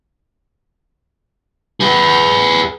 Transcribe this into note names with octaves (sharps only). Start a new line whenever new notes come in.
G#4 B4